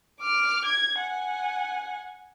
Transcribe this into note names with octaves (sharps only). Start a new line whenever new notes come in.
D6 F6
G#6
F#5 G#5